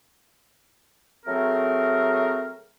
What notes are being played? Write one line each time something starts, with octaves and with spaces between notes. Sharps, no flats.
F#3 A3 C4 G#4 A#4